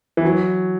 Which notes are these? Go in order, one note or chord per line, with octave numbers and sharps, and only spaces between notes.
E3
F#3